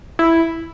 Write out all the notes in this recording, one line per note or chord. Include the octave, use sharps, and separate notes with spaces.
E4